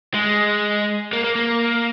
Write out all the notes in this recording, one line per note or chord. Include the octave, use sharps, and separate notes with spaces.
G#3
A#3
A#3
A#3